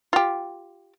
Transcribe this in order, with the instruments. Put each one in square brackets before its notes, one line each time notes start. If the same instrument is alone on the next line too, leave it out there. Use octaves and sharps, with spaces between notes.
[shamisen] F4 G4